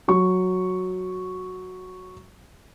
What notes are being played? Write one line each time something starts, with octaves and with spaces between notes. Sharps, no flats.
F#3 C#6